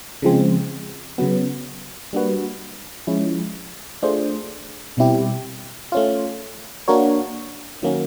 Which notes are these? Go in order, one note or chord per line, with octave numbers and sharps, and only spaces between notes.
C#3 F3 G#3 C4
C#3 F#3 B3
G3 A#3 D4 F#4 B4
F3 G#3 C#4 E4
A3 D4 F4 G#4 C5
B2 G3 C4 E4 G4
A3 C#4 F4
A#3 D4 F#4 A#4 C#5
D#3 F#3 A#3 C#4 F#4